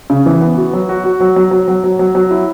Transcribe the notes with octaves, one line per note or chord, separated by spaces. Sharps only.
C#3
E3
B3
F#4
F#3
F#4
F#4
F#3
F#3
F#3
F#3
F#3
F#3
F#3
E4